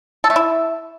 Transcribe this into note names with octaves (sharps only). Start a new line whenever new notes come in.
A4
A3
E4